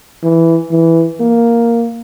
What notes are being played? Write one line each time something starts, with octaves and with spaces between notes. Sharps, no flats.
E3
E3
A#3